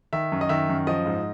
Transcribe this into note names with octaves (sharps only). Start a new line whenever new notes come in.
D#3 E5
F#2
D#5
D#3 E5
F#2
F3 D#5
G#2